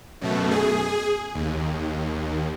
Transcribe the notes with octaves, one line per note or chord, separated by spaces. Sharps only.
F#2 B2 A3
G#4
D#2